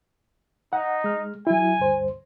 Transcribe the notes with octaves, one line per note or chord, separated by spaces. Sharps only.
D#4 F#5
G#3 F6
F#3 E4 G#5
D2 G2 C5